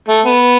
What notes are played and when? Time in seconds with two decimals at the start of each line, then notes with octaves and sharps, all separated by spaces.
0.08 A3
0.25 B3